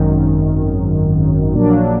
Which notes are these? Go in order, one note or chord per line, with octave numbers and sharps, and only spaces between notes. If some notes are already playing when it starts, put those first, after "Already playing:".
Already playing: G#1 F#2 D#3
A#1 A#2 F#3 A#3 D4